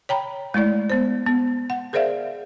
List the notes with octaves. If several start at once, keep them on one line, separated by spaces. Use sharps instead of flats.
C#5 G5 A#5 B5
G#3 A3 E4 D5
B3 C5
B3
F#5
G#4 A#4 C5 D5 E5 F5